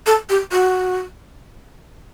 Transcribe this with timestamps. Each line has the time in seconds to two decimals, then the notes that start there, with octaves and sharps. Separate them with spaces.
0.07 A4
0.29 G4
0.52 F#4